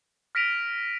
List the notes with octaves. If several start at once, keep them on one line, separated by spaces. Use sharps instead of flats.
F6 A#6 B6 D7 D#7 F7